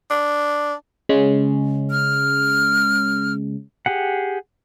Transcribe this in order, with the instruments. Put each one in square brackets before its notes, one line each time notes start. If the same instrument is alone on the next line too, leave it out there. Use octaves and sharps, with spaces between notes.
[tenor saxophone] D4
[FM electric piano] C#3 G#3 C#4
[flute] F6
[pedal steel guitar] G4 G#4 F#5